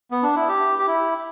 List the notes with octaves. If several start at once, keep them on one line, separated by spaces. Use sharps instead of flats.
B3
D4
E4
G4
G4
E4